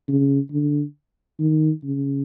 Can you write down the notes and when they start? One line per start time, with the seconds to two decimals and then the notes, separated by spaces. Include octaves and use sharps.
0.08 C#3
0.52 D3
1.40 D#3
1.84 C#3